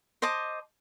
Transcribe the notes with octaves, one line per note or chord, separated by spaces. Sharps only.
C5 D#5 A5 D6